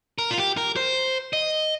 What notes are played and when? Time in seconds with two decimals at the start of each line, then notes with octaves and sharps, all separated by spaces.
0.19 A#4
0.31 F4
0.38 G4
0.57 A#4
0.76 C5
1.33 D#5